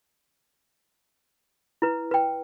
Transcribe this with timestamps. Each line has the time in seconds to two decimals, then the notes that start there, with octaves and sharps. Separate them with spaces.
1.82 E4 B4
2.11 B4 G5